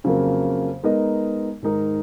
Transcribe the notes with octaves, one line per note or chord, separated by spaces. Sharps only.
F2 C#3 F#3 A#3
G#3 B3 D#4 A#4 D#5
G#2 D#3 G#3 D#4 A#4